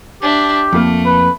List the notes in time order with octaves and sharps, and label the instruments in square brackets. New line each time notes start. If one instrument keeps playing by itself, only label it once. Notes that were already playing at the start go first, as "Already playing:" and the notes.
[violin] D4 E5 [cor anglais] G4
[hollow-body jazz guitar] F2 A#3 [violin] A3
[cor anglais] B4